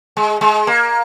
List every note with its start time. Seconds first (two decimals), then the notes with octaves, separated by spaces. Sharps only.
0.17 G#3
0.41 G#3
0.67 A#3